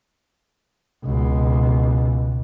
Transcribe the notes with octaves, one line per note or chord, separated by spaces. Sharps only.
C#2 B2